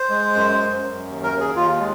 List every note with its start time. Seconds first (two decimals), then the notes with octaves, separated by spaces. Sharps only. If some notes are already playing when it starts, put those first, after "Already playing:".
Already playing: C5
0.10 G#3
0.35 F#2
0.58 F#2
0.82 F#2
1.07 D#2
1.23 A#4
1.31 D#2
1.40 G#4
1.55 D#2 F4
1.79 G#3